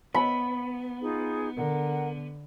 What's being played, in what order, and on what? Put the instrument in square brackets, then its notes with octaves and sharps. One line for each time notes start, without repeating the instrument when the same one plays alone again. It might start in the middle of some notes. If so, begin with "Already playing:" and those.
[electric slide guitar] B3 [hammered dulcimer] B5
[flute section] D#4 F4 G#4
[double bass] D3 [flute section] A#4 F#5